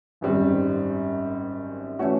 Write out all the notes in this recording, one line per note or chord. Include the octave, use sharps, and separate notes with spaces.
G#1 F#2 D#3 G3 C4
E3 A3 C#4 F#4